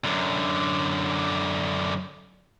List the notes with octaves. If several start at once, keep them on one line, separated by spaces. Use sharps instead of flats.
F#2 D3